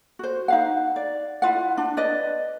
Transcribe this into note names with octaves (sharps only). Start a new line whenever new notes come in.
F#4 C5
D#4 F5 F#5
D5
E4 F4 F#5
D4
B4 D5 D#5